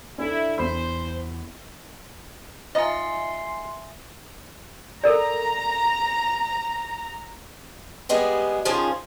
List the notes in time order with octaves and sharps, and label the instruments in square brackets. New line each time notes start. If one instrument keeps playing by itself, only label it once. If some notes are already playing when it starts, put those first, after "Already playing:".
[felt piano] D4 A4 [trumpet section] E4
[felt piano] E2 B5 [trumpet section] C5
[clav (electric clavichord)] D#4 [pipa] F4 D#5 [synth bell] E5 G#5 [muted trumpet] C6
[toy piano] A4 A#4 D5 [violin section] A#5
[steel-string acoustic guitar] G3 G#3 B3 G4 G#4
D#3 F3 C#4 F4 G#4 C5